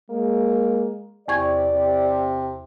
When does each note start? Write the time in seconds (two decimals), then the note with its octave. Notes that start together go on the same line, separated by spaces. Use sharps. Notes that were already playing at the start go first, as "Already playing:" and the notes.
0.10 G#3 A#3
1.28 E2 C3 D5 C#6 G#6
1.73 C3